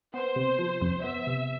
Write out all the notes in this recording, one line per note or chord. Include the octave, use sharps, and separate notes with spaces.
B3 C5
C3
F3
F2
B3 E5
C3